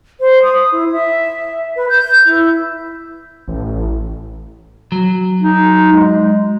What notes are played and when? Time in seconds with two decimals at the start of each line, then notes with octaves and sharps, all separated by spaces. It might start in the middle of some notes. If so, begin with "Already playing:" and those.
0.20 C5
0.42 D#6
0.72 E4
0.92 E5
1.76 B4
1.89 G6
2.26 E4
3.48 A1
4.92 F#3
5.42 D#4
5.93 G#3